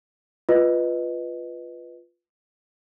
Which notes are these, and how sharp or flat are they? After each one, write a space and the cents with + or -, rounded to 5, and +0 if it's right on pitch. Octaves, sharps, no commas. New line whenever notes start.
F4 +0 B4 +0 D#5 +0